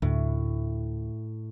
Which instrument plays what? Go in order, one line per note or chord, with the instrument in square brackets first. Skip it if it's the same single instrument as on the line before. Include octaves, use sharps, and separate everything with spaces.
[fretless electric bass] D2 [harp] A2